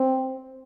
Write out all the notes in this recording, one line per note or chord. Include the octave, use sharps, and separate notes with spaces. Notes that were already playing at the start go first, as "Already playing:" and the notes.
Already playing: C4